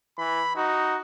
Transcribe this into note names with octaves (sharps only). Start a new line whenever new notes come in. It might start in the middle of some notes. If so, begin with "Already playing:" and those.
E3 B5
D#4 F#4